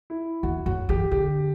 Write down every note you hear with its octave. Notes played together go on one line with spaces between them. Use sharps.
E4
E2 F#4
F#2 F#4
E3 G4
D3 G4